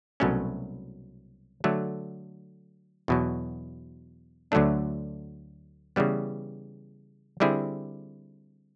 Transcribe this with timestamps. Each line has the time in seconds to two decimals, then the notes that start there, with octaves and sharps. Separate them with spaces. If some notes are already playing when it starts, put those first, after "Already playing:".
0.20 C2 B2 F#3 A3 C#4
1.64 D3 F#3 A3
3.08 E2 B2 F#3
4.52 D2 D3 F#3 A3 D4
5.96 C#3 E3 G3 B3
7.40 D3 G3 C4 E4 G#4